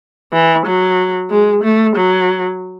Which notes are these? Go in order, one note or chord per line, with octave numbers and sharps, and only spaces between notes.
E3
F#3
G#3
A3
F#3